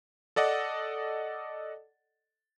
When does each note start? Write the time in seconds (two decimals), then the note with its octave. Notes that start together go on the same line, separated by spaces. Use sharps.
0.36 A4 D5 D#5 F#5